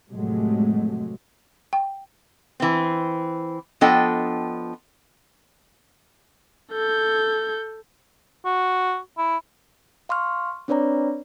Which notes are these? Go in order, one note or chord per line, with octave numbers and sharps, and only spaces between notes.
F1 A2 C3 F#3 G#3 A3
G5
E3 C4
F3 B3 D4 A4 D#5 G5
A4 G6
F#4
E4
F5 C6 C#6 F6
C4 D4 B4 C#5 D5 A#5